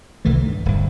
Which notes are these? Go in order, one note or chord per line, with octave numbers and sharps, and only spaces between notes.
C2 D#3 E3 A3
G2
D1 G2